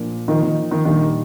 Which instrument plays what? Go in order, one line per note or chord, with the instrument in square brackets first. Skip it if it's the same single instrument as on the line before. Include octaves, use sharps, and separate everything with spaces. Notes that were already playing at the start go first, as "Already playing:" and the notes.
Already playing: [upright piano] A#2 F3 A#3 D4
[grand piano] D#3 [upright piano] F3 A#3 D#4
[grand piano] D#3
D#3
[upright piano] A#2 G3 D4 [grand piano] D#3